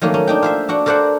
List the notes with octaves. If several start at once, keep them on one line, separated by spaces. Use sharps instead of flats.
D#3 F#3 A3 A#3 C#4
C#4
D4 D#4 G5
F4 C5 E5
D4 F#4 F#5
A4 A#4 C5 D5 E5 F#5